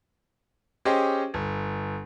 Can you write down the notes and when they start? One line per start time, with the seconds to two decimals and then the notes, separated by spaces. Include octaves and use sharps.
0.85 C#4 G4 G#4 C5 D#5 G5
1.34 G1